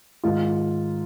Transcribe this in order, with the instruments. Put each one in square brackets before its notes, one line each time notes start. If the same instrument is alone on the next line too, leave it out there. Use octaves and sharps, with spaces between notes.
[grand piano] G#2 D#3 F4